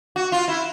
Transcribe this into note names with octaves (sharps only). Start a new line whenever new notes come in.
F#4
F4
E4